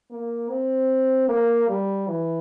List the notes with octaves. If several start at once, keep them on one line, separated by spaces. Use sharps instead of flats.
A#3
C4
A#3
G3
E3